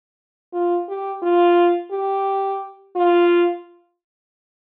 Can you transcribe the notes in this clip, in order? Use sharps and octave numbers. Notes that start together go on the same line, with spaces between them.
F4
G4
F4
G4
F4